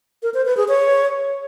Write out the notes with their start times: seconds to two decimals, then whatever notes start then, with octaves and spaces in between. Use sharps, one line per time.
0.23 A#4
0.34 C5
0.46 B4
0.57 G#4
0.68 C#5